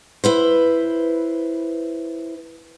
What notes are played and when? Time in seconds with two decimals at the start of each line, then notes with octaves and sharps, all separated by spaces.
0.24 E4 B4 C5